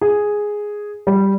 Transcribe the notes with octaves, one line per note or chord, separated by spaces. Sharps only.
G#4
G3